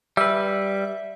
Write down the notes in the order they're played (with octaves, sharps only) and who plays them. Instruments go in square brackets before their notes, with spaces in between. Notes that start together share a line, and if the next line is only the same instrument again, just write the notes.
[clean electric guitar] G3 B4 [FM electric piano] E5